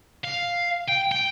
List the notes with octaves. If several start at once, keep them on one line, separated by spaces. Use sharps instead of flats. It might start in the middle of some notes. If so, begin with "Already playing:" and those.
F5
G5
G5